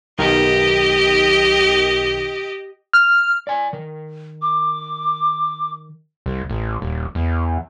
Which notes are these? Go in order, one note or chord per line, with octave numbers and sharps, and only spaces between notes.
B1 D#3 G4 D#5
F6
D5 G#5
D#3
D6
C2
A1
D#1
E2